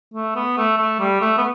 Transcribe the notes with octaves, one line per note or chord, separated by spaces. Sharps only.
A3
B3
A3
A3
G3
A3
B3